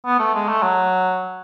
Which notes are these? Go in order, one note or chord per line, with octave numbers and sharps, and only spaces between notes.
B3
A3
G#3
A3
F#3